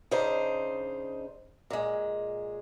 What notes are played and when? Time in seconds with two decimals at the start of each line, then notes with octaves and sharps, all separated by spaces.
0.11 C#3 D4 D#4 C5
1.70 A#2 G#3